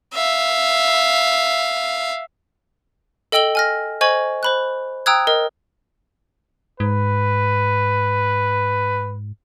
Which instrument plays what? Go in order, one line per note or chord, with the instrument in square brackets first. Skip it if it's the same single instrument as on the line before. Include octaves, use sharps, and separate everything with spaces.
[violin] E5 F5
[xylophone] A4 D#5 G5 E6 F#7 G7
G#5 F6 A#6
C5 D#5 G#5 C#6 G#6 F#7
C5 B5 F#6
G5 A#5 D#6 E6 F#6 G#6
A#4 D#5
[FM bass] G#2 [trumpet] B4